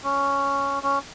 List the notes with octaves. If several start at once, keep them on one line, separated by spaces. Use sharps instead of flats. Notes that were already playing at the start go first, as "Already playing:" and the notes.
C#4
C#4